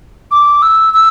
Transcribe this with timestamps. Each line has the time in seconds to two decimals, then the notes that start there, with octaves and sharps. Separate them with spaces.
0.31 D6
0.62 E6
0.94 E6